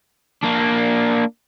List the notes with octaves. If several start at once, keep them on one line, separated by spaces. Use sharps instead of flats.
A#3 D4